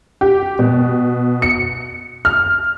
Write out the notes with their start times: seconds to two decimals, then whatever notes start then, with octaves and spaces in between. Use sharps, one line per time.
0.21 G4
0.59 B2
1.42 C#7
2.25 F6